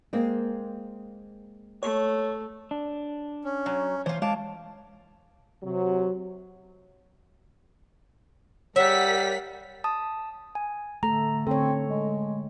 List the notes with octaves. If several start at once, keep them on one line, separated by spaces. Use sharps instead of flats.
G#3 A#3 C4
A3 C#5
D4
C#4
F#3
E3 F4 C5 C#5
G#3 C#5 F5 A5 D6
C3 F#3
G3 A#4 C#5 E5 F#5 B6
A5 D#6
G#5
D3 A3 A4 A#5
D3 C4 A4 C#5
G#3